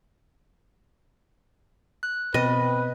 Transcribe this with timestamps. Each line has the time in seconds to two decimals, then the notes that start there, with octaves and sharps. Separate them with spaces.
2.03 F#6
2.34 B2 C4 B4 D#5